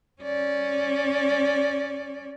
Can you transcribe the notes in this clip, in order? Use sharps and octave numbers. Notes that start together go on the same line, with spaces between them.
C#4 D5